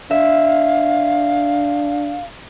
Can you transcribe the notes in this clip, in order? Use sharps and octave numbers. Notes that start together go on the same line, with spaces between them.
D4 E5 F5